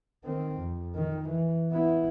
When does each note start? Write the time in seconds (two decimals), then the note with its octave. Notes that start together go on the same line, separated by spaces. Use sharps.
0.25 D#3 C4
0.58 F2
0.95 D#3
1.29 E3
1.71 B3 E4